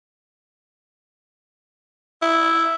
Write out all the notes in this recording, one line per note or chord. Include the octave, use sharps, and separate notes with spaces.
E4